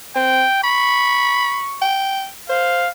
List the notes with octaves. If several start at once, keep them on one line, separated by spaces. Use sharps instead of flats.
C4 G5
B5 C#6
G5
C5 F5